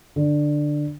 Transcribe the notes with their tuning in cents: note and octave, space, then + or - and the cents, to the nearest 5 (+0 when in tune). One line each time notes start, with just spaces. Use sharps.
D3 +10